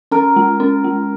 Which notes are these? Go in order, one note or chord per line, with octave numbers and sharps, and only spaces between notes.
C#4 A#4
G#3
C#4
G#3